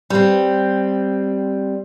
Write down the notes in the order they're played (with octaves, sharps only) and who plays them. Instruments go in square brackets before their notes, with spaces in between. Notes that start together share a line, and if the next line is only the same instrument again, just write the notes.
[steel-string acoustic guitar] G3 C4